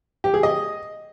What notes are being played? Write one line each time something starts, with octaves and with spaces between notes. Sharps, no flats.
G4
G#4
D#5